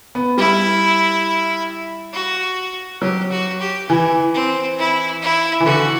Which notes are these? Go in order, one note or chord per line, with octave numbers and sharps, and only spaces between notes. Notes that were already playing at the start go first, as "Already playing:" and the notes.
B3
G3 E4
F#4
F#3 G4
F#4
G4
E3 E4
C4
E4
E4
E3
D3 F#4